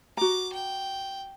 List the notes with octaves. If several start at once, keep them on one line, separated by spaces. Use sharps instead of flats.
F#4 A#5 D6
G5